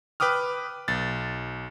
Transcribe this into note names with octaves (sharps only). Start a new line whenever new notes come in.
B4 G5 D6 D#6 F6
B1 A6